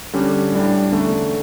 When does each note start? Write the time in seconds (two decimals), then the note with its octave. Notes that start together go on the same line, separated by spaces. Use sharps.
0.13 D3 G3 C#4 G4
0.52 A2 G3 D4
0.92 E2 D3 A3 C#4